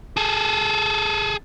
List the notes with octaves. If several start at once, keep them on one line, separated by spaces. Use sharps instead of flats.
G#4 A4